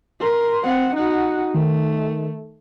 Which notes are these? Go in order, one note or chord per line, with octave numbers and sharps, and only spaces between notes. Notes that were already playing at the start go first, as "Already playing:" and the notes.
A#4 C6
C4 F#5
D#4 F#4 F#5
D#3 A3